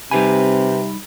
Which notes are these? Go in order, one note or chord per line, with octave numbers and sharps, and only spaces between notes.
C3 G3 C4 D#4 G4 B4 G#5 B5